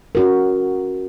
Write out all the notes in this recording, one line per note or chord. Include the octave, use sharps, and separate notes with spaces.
C#4 F#4 A#4